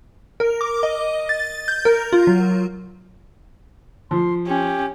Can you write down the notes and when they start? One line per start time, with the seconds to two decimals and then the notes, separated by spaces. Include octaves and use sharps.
0.40 A#4
0.61 D6
0.83 D#5
1.29 A6
1.68 G6
1.85 A#4
2.13 F4
2.27 F#3
4.11 F3 C6
4.47 C#4 G4